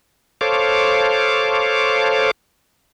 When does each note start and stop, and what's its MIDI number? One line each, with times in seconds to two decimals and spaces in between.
0.41 2.31 69
0.41 2.31 72
0.41 2.31 73
0.41 2.31 77
0.41 2.31 86